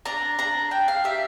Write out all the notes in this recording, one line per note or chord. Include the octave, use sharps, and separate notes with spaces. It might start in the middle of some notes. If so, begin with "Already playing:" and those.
D4 A#5
D4 A#5
D4 G5
F5
G4 E5